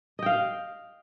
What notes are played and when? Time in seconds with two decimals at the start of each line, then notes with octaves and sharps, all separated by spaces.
0.19 D#5
0.22 G5
0.26 F5